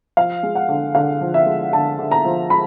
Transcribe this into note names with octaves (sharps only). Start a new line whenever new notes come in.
F3 F5
G#3
F#5
D3
D3 F5
F3
E5
G#3
D3 A5
D3
A#5
F3
G#3 B5